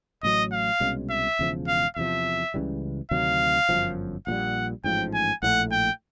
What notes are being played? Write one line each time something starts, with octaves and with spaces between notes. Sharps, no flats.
A1 A2 F#3 D#5
F5
C2 B2 G#3 C#4
E5
E1 E2 C#3 F3
F5
E2 C3 F3 E5
C#2 C#3 E3 G3
D2 C3 D#3 F#3 F5
G1 F#2 D3 F3
A#1 A#2 G3 F#5
A1 G#2 F3 G5
G#5
A#1 A2 E3 A3 F#5
G5